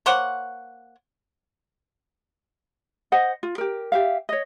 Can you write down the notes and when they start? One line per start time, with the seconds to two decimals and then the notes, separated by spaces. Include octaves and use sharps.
0.06 A#3 C5 C#5 F#5
3.12 C5 D#5 F#5
3.43 F4
3.58 G4 A#4
3.92 G4 E5 F5
4.29 C#5 D#5